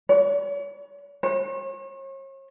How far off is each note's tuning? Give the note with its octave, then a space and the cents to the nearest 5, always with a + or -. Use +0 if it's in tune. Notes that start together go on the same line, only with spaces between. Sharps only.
C#5 +40
C#5 -40